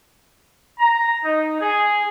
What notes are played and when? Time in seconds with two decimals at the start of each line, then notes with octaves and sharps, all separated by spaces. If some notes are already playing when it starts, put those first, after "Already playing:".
0.78 A#5
1.24 D#4
1.61 G#4